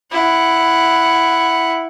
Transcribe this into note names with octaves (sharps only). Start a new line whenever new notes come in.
E4 F#5